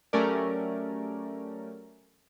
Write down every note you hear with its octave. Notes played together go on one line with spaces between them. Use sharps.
F#3 A3 C#4 G4 A#4 D5